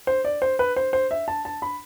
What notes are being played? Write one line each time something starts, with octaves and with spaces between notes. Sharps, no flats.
C5
D5
C5
B4
C5
C5
E5
A5
A5
B5